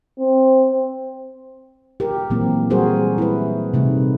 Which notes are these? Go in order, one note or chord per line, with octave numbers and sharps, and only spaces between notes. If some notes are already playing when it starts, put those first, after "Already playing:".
C4
G4 A#4
A#2 E3 F#3 A#3 C4
G3 A#3 F#4 G#4 A#4 C5
E4 B4
C3 G3 A3 D#4